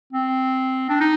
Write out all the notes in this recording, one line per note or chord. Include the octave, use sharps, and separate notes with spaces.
C4
D4
D#4